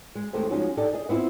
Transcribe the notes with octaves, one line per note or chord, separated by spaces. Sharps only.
G#3
D#2 G#3 A3 C4 G4 C5
F3 G#3 C#4 D#4 F#4
D4 D#4 G4 A4 D#5
G#4 D#5
B3 C4 E4 F4